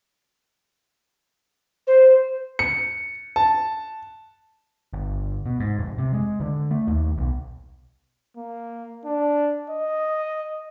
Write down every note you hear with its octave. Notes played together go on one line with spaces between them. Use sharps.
C5
C#7
A5
G1
B2
G#2
F1
C3
G#3
D3
A3
D#2
B1
A#3
D4
D#5